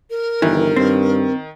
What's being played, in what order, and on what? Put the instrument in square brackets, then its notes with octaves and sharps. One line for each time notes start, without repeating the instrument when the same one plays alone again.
[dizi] A#4
[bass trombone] G1 [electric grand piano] D#3 [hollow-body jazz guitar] E3
[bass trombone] G2 [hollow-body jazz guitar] C4